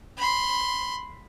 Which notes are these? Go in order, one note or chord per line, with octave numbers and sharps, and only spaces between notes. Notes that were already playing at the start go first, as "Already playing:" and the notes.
B5 C6